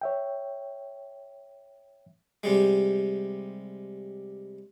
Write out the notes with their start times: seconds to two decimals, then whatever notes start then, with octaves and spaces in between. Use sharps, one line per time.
0.01 C#5 E5 G5
2.43 C3 G3 G#3